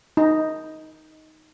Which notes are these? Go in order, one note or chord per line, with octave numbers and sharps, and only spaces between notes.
D#4